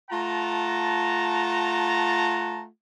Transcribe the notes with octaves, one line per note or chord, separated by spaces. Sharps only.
A3 F4 F#5 A5 A#5